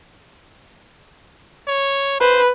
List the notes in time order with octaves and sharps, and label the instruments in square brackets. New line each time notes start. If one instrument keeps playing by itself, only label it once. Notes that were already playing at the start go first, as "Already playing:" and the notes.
[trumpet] C#5
[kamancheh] B4 [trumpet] C5